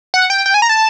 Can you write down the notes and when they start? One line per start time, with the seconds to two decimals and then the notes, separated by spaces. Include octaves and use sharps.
0.14 F#5
0.30 G5
0.46 G5
0.54 G#5
0.62 A#5
0.69 A5